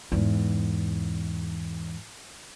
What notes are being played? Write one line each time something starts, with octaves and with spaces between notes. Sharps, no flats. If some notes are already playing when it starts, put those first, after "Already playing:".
E2 G#2